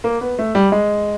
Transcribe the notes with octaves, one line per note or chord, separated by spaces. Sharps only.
A#3
B3
A3
G3
G#3